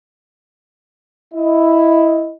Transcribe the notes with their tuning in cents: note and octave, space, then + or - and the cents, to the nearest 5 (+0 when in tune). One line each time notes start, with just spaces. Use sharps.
E4 +0 D#5 +10